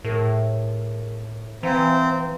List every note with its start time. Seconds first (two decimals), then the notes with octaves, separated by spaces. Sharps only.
0.05 A2 G#4 A#4
1.63 E3 C4 B4 F5 A#5